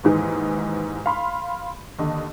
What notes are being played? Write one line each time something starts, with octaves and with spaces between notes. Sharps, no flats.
D#2 G#2 E3 D#4
F5 B5 C6
D#2 D3 D#5